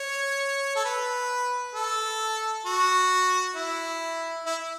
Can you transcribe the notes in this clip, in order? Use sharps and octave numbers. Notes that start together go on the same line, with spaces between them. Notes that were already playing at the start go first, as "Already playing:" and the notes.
Already playing: C#5
A4
B4
A4
F#4
E4
E4